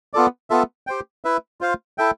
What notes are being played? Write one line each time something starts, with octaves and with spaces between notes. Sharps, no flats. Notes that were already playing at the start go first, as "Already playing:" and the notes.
B3 F4 A4 D5
B3 F4 A4 E5
G4 C5 G5
E4 B4 E5
F4 C5 F5
E4 A4 E5 G5